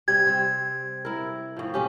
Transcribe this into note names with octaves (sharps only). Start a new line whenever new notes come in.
C3 G3 G#6
G3 C4
E4 A#4
A2 F3
C3 C#4 G4